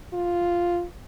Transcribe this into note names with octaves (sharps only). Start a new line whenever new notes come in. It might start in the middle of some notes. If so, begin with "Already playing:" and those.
F4